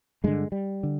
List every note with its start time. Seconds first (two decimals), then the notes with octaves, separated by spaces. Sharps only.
0.24 G2 D3 G#3
0.52 G3
0.83 D3